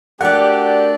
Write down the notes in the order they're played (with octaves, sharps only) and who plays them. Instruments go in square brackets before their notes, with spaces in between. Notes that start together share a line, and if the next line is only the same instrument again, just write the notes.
[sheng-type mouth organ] A3 D4 F#4 [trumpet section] G4 [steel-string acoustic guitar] A#4 D5 [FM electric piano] F#5